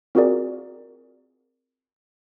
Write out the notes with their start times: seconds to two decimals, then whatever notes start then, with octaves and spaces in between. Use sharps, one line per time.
0.15 C4 F4 F#4 G#4 A#4 D5